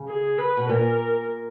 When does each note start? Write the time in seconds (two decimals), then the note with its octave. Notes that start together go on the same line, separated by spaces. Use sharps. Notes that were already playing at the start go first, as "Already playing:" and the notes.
Already playing: C#3
0.08 G#4
0.39 B4
0.57 B2
0.69 A#2 A#4